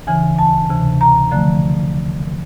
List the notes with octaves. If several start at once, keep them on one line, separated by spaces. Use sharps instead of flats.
D2 C#3 E3 G#5
A5
D2 C3 E3
A#5
D3 F3 A3